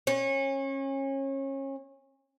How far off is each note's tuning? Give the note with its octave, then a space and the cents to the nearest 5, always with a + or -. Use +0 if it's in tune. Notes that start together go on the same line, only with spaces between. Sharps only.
C#4 -30